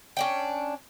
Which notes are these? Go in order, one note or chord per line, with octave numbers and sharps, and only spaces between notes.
C#4 D4 G5